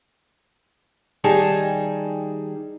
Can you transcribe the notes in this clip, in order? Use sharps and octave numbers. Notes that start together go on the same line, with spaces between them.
D#3 G3 D#4 G#4 A5